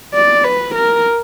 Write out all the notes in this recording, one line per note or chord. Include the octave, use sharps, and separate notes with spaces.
D5
B4
A#4